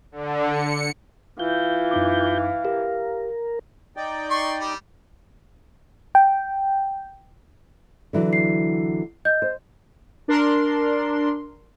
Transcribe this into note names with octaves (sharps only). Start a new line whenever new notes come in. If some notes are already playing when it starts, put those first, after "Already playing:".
D3
C#7
E3 F4 F5 G6
F#2 D#4 D6
G4 A#4
D#4 D5 G5
C6 C#6
G3
G5
D3 E3 F#3
C7
D#5 G6
C5
D4 A#4 C6